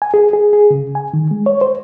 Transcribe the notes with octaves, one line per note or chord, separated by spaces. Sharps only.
G#5
G#4
G#4
G#4
C#3
G#5
D#3
G#3
C#5
C5